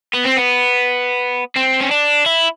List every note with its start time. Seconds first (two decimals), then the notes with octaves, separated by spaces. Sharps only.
0.14 B3
0.26 C4
0.37 B3
1.56 C4
1.80 C#4
1.91 D4
2.26 E4